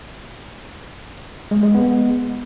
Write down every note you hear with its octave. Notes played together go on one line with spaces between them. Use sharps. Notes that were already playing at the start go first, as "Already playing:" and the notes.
G#3
G#3
B3